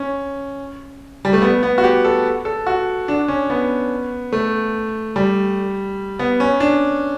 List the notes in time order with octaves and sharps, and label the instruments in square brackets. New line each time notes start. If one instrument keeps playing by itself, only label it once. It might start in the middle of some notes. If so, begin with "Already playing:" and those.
Already playing: [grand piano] C#4
G3
A3
B3
B3
F#4
G4
A4
A4
F#4
D4
C#4
B3
A3
G3
B3
C#4
D4